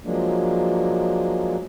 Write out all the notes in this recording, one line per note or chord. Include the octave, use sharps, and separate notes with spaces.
F3 F#3 G#3 A#3 D4